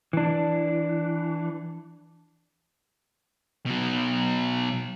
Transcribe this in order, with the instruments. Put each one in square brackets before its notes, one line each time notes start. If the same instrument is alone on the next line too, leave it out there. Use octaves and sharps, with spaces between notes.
[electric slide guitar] E3 D4
[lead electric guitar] B2 F#3